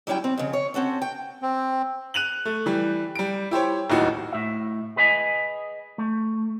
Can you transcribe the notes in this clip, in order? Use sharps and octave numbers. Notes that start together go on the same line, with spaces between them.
F#3 G3 C#4 E4 G5
C4
F2 C#3
C#5
C4 C#4 F#4 A4
G5
C4
F#6 D#7 F7 F#7
A3
E3 G3
G3 D7
E4 G4 C5 C#5
D1 D#2 D#4 E4 F#4
A2 E5
G#4 B4 D#5 E5 G#5
A3